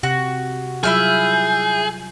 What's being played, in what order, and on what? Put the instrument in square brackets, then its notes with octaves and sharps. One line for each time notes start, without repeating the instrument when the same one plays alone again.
[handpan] C3 G4 [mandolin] F#4
[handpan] F#3 G3 F4 [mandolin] E4 E5 F6 [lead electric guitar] G#4 [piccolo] G6